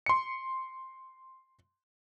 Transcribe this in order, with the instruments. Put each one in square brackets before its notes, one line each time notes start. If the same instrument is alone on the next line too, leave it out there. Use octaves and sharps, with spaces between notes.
[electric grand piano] C6 C#7